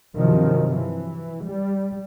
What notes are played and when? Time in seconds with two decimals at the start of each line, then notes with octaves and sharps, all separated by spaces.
0.16 G2 C3 D#3 F3 F#3
0.76 E3
1.45 G3